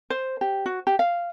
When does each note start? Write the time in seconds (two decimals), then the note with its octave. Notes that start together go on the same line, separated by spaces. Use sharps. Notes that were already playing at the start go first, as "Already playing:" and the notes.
0.10 C5
0.41 G4
0.66 F#4
0.87 G4
0.99 F5